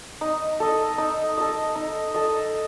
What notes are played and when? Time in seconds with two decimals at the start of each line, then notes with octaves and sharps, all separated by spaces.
0.21 D#4
0.60 A4 D#5
0.98 D#4
1.37 A4 D#5
1.76 D#4
2.14 A4 D#5